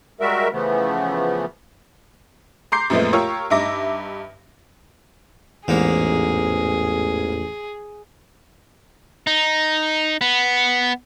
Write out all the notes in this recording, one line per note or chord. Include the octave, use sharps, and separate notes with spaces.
G3 G#3 F#4 A#4 E5
C#3 E3 F3 A3 B3
A#5 C6 D6 G6 C7
F#2 A#2 F3 G#3 A3 B3
F4 G4 A#4 C#5 C#6 E6
G2 D#4 E5 D6 A#6
A1 E2 G#2 A#3 G#4
D#4
B3